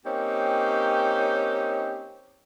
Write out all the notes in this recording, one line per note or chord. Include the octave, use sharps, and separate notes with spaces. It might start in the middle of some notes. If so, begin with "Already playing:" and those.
A#3 C4 C#4 D#4 G4